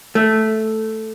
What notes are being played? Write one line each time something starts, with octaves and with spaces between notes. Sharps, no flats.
A3